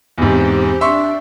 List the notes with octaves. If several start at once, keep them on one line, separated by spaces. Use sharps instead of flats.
E2 G#2 C4 G4
D4 E5 C6 C#6